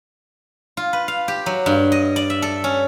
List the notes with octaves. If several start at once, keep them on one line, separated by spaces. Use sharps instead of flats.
F4
B4
F5
G4
F#3
G2
D#5
D5
E5
A4
C#4